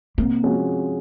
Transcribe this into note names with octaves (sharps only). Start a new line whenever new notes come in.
C3 A#3
F3 G#3 C#4 F#4